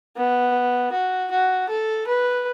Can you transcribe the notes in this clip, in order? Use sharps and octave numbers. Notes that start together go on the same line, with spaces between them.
B3
F#4
F#4
A4
B4